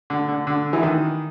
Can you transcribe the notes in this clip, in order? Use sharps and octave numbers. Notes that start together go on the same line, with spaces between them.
D3
D3
D3
E3
D#3